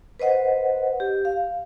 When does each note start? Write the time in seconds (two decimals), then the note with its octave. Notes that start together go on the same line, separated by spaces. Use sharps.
0.19 B4 C5 D#5 F#5
1.00 G4
1.25 F5